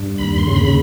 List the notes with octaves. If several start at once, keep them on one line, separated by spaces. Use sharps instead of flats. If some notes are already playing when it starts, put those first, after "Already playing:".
Already playing: G2
D#2 B5
C6
C#3
B5